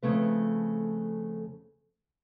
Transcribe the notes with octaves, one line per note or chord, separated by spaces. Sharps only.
F2 C#3 A3 B4